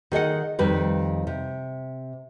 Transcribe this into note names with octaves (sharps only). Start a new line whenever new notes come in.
D#3 G#4 D#5 F#5
F2 D#3 G3 B4
C3